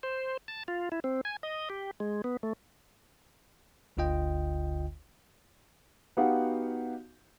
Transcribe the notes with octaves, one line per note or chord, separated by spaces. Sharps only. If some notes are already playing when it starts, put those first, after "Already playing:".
C5
A5
F4
E4
C4
G#5
D#5
G4
G#3
B3
A3
G1 D2 D3 F4 D#5 G5
B3 D#4 F#4 G4 F5 F#5